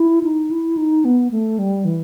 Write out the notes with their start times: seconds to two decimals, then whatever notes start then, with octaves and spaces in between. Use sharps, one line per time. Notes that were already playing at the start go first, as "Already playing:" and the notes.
Already playing: E4
0.23 D#4
0.51 E4
0.77 D#4
1.05 B3
1.31 A3
1.59 G3
1.85 E3